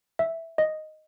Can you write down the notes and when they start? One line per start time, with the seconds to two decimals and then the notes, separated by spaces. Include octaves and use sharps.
0.19 E5
0.58 D#5